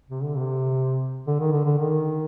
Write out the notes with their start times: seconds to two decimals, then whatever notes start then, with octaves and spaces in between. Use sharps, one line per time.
0.10 C3
0.23 D3
0.37 C3
1.27 D3
1.40 D#3
1.52 D3
1.65 D3
1.78 D#3